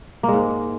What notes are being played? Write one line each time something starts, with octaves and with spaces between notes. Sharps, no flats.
A#3
G#3
G#2